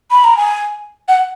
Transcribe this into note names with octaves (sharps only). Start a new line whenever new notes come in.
B5
A#5
G#5
F#5